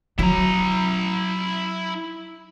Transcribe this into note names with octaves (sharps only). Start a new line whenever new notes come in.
F#3 E4 A#5